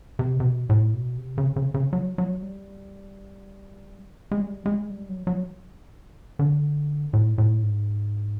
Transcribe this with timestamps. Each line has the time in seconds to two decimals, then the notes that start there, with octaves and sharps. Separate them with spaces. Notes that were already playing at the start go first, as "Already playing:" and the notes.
0.19 C3
0.40 C3
0.44 B2
0.70 A2
0.94 B2
1.18 C3
1.38 C#3
1.56 C#3
1.74 C#3
1.93 F#3
2.18 F#3
2.42 G3
4.31 G#3
4.41 G3
4.66 G#3
4.90 G3
5.09 F#3
5.27 F#3
6.39 D3
7.13 A2
7.38 A2
7.62 G#2